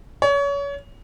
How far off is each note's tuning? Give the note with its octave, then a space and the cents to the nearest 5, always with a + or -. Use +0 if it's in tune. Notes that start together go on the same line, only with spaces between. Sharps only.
C#5 +30